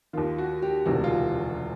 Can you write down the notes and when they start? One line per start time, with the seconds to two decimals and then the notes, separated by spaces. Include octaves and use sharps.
0.13 D#2 D#3 F4
0.38 F#4
0.62 G4
0.85 E1 D2 C3 D#3 F#4
1.04 F4